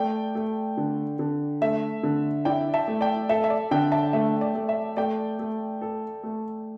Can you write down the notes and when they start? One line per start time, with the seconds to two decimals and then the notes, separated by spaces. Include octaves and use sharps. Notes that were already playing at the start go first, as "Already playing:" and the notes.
Already playing: A3 D5 G5
0.35 A3
0.77 D3
1.19 D3
1.61 A3 E5
2.03 D3
2.45 E4 D5 G5
2.74 E5 A5
2.88 A3
3.01 D5 G5
3.29 A4 E5
3.44 E5
3.50 D5
3.71 D3 D5 G5
3.92 E5 A5
4.13 A3 E5
4.41 D5
4.55 A3
4.69 E5
4.97 A3 D5 G5
5.39 A3
5.81 A4
6.23 A3